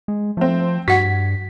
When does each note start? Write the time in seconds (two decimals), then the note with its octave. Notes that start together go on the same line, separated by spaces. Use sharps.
0.08 G#3
0.37 F3 A3 C4
0.88 G2 F#4 F#5 G#6 B6